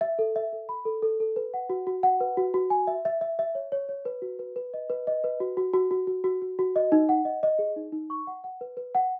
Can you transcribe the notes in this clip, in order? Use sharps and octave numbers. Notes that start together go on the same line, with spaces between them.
E5
A4
E5
A4
B5
A4
A4
A4
B4
F#5
F#4
F#4
F#5
B4
F#4
F#4
G#5
E5
E5
E5
E5
C#5
C#5
C#5
B4
F#4
B4
B4
D#5
B4
D#5
B4
F#4
F#4
F#4
F#4
F#4
F#4
F#4
F#4
D#5
D#4
F#5
D#5
D#5
G#4
D#4
D#4
C#6
F#5
F#5
B4
B4
F#5